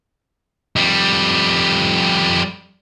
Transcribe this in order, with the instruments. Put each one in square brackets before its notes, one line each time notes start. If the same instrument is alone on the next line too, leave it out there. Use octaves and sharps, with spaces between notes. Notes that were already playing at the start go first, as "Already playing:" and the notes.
[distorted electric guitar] F2 G3